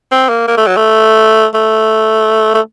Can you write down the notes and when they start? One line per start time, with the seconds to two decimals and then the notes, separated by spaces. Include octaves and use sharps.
0.11 C4
0.29 A#3
0.48 A#3
0.57 A3
0.67 F#3
0.77 A3
1.54 A3
2.55 A3